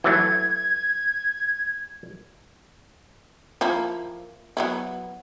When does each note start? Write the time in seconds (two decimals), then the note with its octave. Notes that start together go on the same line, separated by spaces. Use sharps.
0.04 E3 F#3 A3 G#6
3.61 F3 A#3 E4
4.57 F#3 B3 E4